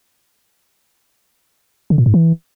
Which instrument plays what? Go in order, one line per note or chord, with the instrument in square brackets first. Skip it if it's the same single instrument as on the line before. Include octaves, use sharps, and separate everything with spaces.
[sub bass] D3
A#2
G#2
E3